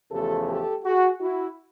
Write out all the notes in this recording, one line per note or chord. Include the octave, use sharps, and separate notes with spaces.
E2 C#3 F3 A3 G4 A4
G4 A4
F#4 G#4
E4 F#4